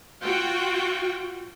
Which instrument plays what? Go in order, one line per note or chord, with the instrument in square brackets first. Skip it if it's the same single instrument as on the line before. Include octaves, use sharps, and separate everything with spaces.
[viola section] F4 F#4 G5